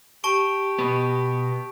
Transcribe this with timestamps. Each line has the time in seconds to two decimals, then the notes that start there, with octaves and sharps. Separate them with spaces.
0.24 G4 A5 C#6 D7
0.79 B2 B3